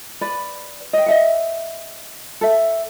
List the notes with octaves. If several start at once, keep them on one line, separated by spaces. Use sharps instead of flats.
B4 D5 B5
D#5 G5
D#5 E5 F#5
A4 E5